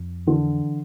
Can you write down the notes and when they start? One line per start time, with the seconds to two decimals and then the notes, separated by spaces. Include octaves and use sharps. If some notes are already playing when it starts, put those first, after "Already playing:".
Already playing: F2
0.27 D3 E3